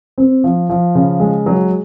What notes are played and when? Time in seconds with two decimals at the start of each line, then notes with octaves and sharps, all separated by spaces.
0.18 C4
0.44 F3
0.70 F3
0.95 C#3
1.20 G#3
1.46 F#3